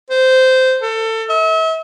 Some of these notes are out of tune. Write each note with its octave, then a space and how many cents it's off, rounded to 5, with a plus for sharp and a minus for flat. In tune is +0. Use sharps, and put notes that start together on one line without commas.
C5 -15
A4 +25
E5 -40